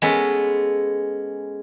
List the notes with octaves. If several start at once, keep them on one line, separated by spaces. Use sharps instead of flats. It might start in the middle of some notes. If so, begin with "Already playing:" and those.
G#3 B3 C#4 A4